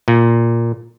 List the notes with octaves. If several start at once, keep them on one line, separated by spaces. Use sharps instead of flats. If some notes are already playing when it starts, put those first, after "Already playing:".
A#2